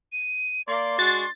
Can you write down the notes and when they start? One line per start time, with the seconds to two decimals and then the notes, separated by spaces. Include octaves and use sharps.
0.12 D#7
0.67 A#3 D5 C6
0.99 G#3 D4 F#4 A6